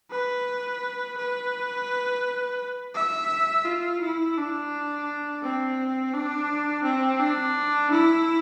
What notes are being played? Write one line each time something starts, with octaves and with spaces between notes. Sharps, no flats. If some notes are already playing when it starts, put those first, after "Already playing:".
B4
B4
E5
F4
E4
D4
C4
D4
C4
D4
E4